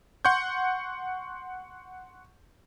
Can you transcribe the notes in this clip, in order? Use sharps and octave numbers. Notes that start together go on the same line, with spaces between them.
F#5 C6 C#6 G6